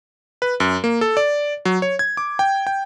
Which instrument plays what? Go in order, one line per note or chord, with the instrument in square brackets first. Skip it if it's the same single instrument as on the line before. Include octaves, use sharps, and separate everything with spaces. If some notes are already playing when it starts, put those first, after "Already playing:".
[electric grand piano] B4
F#2
A#3
A4
D5
F#3
C#5
G#6
D6
G5
G5